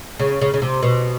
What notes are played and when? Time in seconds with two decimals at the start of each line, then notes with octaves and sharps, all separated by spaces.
0.19 C#3
0.41 C#3
0.54 C#3
0.62 C3
0.83 B2